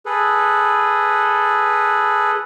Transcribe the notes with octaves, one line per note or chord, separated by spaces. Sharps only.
G#4 A4 B4